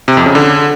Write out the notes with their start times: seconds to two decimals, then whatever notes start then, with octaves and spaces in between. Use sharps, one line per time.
0.08 C3
0.17 F2
0.26 C#3
0.35 D3